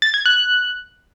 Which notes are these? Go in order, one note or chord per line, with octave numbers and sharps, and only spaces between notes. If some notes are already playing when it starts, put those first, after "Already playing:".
A6
G#6
F#6